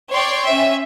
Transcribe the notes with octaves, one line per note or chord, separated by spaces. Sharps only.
C#5 D5 G5 C6
C#4 E5